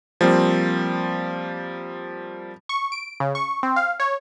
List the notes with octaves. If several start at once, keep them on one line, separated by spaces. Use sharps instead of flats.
F3 G3 A#3 C4
C#6
D7
C#3
C#6
C4
F5
C#5